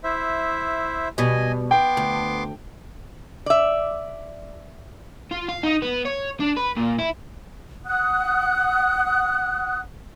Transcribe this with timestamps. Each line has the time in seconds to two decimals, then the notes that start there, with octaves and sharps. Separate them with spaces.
0.04 E4 C5 E5
1.18 B2 G3 D#5 G#5
1.71 B3 G5 C6 D6
1.97 D2
3.46 D5 E5
5.31 F4
5.48 F5
5.63 D#4
5.82 B3
6.05 C#5
6.40 D4
6.57 B4
6.77 A#2
6.99 E4
7.85 F#5 D#6 F#6